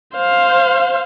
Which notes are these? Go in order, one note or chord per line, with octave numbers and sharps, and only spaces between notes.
C5 F5